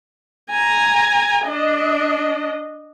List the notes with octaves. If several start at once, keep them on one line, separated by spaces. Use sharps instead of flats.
G#5 A#5
D4 D#5